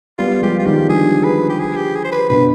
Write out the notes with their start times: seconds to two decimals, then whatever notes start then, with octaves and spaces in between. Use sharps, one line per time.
0.18 G3 B3 F4
0.42 F3 G#3 G4
0.59 F4
0.66 D#3 G3 G4
0.89 D3 F3 G#4
1.24 B4
1.49 G4
1.59 G#4
1.76 G4
1.95 G#4
2.04 C5
2.12 B4
2.29 B2 D3 B4